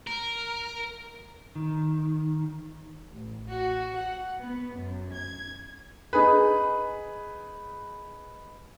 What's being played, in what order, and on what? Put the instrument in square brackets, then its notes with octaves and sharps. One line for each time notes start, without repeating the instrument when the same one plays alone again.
[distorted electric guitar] A#4
[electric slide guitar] D#3
[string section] A1
F#4
F#5
B3
F#2
G#6
[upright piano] D#4 G#4 B4